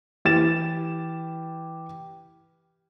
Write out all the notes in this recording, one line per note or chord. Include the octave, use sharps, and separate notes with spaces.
E3 G4 A6 E7